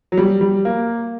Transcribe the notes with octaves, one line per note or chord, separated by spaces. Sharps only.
F#3
G3
G3
A#3